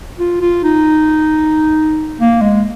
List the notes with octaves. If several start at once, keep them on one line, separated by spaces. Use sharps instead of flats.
F4
F4
D#4
A#3
G#3